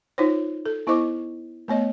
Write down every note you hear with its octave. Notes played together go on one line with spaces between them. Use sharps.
D#4 F4 C5 C#5
A4
B3 E4 C5 D#5 C#6 D6
A3 B3 C#5 D#5